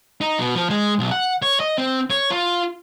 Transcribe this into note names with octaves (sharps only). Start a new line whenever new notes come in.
D#4
B2
F3
G#3
B1
F#5
C#5
D#5
C4
C#5
F4